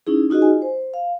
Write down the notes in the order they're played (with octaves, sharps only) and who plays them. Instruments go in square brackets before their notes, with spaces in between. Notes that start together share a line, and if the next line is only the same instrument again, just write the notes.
[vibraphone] C#4 D#4 E4 G#4
D#4 F4 F#4 G#4 D#5
G#5
C5
F5